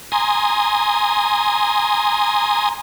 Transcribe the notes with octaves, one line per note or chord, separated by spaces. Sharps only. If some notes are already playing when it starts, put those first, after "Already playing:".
G#5 A#5 C6 D#6